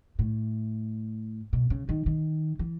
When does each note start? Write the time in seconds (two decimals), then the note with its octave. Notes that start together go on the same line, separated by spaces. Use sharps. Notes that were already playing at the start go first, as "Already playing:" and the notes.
0.19 A2
1.53 B2
1.70 C#3
1.89 D#3
2.06 D#3
2.59 E3